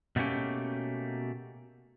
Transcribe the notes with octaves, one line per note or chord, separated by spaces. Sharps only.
B2 A3 A#3 C#4 G4